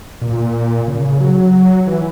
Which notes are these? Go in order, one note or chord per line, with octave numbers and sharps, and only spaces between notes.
A#2
C#3
F#3
E3